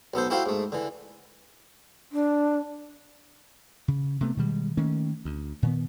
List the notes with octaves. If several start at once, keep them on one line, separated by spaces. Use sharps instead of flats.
B1 B3 A4 C5
E4 F#4 G4 A4 C5 F5
G#2 A3
D3 E3
D4
C#3
C3 A3 B3
B2 D#3 G3 G#3
D#3 A3 A#3 C#4
D2
A#2 D#3 B3